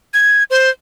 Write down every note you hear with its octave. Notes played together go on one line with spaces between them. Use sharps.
G#6
C5